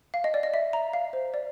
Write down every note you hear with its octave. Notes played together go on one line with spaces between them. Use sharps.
F5
D#5
D5
D#5
E5
A#5
F5
C5
D5